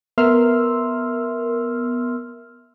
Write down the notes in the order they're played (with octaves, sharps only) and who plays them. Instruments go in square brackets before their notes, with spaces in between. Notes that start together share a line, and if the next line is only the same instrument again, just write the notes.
[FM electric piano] B3 A#4 E5 C6 E6 F6